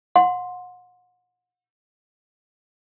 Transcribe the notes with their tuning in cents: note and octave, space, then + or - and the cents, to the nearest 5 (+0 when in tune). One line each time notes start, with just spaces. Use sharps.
F#5 -40 C6 +0